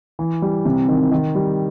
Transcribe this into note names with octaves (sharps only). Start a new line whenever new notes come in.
E3
G3
C3
D#3
D#3
G3